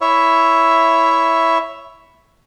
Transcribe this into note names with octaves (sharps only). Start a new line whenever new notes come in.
E4 C#5 E5